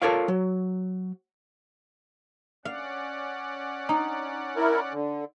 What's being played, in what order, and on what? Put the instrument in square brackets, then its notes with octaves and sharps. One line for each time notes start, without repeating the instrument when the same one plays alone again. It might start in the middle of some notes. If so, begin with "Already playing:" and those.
[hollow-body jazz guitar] F4 A4 A#4 C#5 D5 F5
F#3
[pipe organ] C#4 D5 F#5 [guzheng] F5
[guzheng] D#4
[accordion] E4 A#4
D3